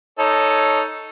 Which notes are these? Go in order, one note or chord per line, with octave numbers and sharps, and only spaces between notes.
D#4 A4 C#5